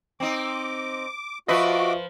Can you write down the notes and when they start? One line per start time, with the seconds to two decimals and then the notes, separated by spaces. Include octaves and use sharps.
0.20 C4 D#4 D6
1.48 F3 F4 F#4 B4 D#5 E5 C#6 D6